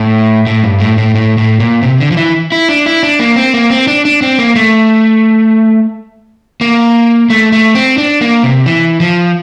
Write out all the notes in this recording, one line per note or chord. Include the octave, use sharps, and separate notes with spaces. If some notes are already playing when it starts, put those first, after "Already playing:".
Already playing: A2
A2
G2
A2
A2
A2
A2
A#2
C3
D3
F3
E3
E4
D4
E4
D4
A#3
C4
A#3
C4
D4
D4
C4
A#3
A3
A#3
A3
A3
C4
D4
A#3
C3
E3
F3